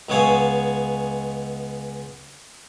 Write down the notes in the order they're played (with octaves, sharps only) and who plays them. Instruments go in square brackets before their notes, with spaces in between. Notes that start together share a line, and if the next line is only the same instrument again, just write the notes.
[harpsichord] C#2 G#3 B3 C#5 F5 G#5